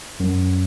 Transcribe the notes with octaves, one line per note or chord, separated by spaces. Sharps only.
F#2